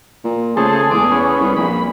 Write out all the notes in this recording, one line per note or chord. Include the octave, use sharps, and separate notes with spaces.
A#2
C#3 A3 G#4 A4 C5
E2 G#3 D6
B3 C#4
C2
A#1 B5